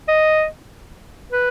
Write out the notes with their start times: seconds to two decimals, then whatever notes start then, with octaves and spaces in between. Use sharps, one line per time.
0.08 D#5
1.32 B4